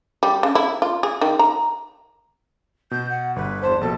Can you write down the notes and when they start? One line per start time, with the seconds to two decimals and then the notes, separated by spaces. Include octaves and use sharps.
0.23 G3
0.43 C#3
0.55 E4
0.82 F4
1.03 G#4
1.21 D#3
1.39 A#5
2.91 B2 G6
3.10 F#5
3.36 G1 B4
3.63 E2 C5 A5
3.81 A#1 B2 A4 A5